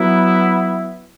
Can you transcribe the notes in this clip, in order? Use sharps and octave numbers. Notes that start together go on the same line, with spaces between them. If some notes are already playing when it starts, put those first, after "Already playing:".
Already playing: F#3 B3 E4